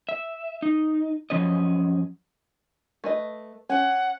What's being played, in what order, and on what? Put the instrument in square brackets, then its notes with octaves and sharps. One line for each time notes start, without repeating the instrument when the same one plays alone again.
[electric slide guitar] E5
D#4
F#2 D#3 F3 C#4 C#5 D#5
[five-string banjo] A3 B4 D#5
[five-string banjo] C#4 [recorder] F#5